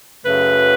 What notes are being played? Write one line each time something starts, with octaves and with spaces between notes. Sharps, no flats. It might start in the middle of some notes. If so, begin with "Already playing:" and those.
F#2 C#3 F#3 A3 B4